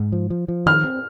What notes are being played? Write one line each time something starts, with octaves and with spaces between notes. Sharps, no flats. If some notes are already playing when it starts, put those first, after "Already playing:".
Already playing: G#2
F3
F3
F3
D#3 F6
C4